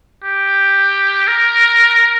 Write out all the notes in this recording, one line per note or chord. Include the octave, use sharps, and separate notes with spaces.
G4
A#4